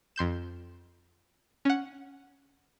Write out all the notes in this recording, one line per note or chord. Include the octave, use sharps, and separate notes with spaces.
F2 C6 G6 E7
C#4 F#5